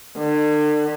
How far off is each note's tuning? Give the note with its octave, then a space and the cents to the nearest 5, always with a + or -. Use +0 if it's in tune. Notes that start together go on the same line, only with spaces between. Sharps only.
D3 +40